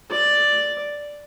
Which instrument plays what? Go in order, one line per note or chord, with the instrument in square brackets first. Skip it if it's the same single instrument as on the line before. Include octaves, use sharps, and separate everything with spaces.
[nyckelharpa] D5